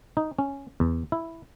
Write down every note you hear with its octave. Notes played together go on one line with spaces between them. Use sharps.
D#4
C#4
E2
E4